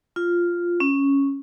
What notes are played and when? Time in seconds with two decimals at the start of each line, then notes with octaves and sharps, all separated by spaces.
0.16 F4
0.80 C#4